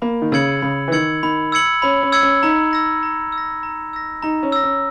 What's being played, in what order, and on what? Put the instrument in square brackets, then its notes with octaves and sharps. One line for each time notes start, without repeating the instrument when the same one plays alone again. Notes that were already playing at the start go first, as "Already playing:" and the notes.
[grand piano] A#3 [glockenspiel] B5
[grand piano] D#3
[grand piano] C#3 [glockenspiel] E6 G#6 C#7 F#7
[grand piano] C#3 [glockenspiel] B5
[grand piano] E3
[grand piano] D#3 [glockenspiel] E6 G#6 C#7 F#7
[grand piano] D#3 [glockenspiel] B5
[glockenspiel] E6 G#6 C#7 F#7
[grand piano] C#4 [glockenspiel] B5
[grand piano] C#4
[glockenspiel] E6 G#6 C#7 F#7
[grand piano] C#4
[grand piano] D#4 [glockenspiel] A#5
[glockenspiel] E6 A#6
A#5
E6
A#6
A#5
E6 A#6
[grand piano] D#4 [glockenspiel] A#5
[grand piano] C#4
[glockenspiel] E6 A#6
[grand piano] C#4